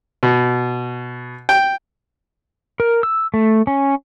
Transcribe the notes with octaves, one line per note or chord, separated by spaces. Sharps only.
B2
G5
A#4
E6
A3
C#4